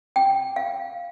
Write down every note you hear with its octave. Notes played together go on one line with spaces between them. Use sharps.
G5
F5